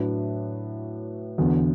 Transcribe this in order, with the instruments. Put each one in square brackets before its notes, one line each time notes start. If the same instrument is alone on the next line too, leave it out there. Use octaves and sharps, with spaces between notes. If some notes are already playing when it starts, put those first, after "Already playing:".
Already playing: [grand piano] A2 F#3 D4 B4
E2 D3 B3 F#4